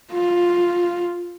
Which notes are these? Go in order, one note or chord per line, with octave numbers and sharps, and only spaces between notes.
F4